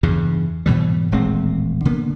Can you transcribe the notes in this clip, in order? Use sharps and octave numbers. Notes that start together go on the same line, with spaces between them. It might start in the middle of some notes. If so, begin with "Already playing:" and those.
E2 G2 C#3
G#2 B2 E3 G3
D#1 A1 G#3 C4
D3 A#3 B3